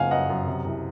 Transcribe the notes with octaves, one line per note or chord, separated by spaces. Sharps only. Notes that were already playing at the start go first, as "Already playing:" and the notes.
Already playing: F#1 C#3 F3 F5 F#5 G#5
F#2 D#5 F#5
F#2
C3
C2